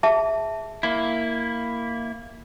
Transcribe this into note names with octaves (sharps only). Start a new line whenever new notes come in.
G#4 E5 A5
A#3 E4